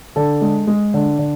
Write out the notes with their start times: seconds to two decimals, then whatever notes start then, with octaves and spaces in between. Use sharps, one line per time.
0.16 D3 A4
0.41 G#3
0.67 G#3
0.94 D3
1.19 D3